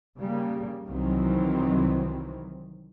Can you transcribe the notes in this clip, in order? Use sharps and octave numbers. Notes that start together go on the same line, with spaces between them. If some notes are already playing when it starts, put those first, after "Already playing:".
C#3 G3 A#3
C2 D#3 E3 F#3 C4